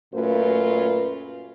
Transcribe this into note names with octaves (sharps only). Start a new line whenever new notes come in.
F#2 A#2 A3 F4 B4